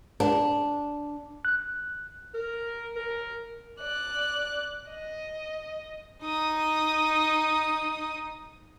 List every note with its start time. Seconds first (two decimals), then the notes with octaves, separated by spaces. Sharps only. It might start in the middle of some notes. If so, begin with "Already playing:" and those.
0.20 D4
1.45 F#6
2.34 A#4
2.96 A#4
3.80 D5 F#6
4.90 D#5
6.22 D#4 D#6